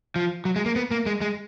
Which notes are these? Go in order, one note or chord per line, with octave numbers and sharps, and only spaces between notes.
F3
F#3
G#3
A#3
B3
A#3
G#3
G#3